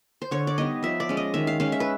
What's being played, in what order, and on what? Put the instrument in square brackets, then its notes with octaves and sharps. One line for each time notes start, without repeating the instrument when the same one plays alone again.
[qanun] C5
D3 C#5
D5
G3 B3 D#4 D#5
F3 E5
D5
G#3 C#4
D#5
D#3 E5
F5
G#3 C#4 F5
E5
B4